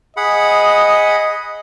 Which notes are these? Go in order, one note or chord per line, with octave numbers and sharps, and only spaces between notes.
G#4 D#5 F#5 B5